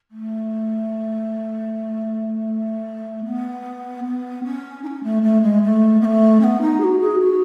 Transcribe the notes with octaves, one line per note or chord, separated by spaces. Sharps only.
A3
B3
B3
C#4
D#4
C#4
A3
A3
G#3
A3
B3
A3
C#4
B3
D#4
G#4
F#4
G#4
F#4